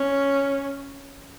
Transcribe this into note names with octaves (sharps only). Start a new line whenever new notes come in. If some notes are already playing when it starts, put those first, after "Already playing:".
Already playing: C#4